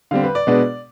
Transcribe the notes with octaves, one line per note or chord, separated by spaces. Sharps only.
D3 G3 C4 F5
B4
D5
B2 G#3 B3 D4